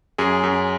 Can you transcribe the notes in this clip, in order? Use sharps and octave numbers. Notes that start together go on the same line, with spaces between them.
F#2 G#4
F#2